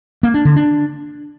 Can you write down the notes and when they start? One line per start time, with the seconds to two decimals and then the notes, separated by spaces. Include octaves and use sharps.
0.23 A#3
0.34 D4
0.45 D3
0.56 D4